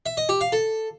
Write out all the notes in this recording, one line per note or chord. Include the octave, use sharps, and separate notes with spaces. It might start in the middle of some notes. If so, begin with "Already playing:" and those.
E5
D#5
G4
F5
A4